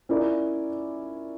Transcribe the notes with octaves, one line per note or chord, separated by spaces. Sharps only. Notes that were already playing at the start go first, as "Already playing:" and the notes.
C#4 E4 A#4 D5